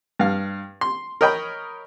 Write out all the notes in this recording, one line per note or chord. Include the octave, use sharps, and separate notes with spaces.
G2 F5
C6
A#4 C#5 D#5 G5 B5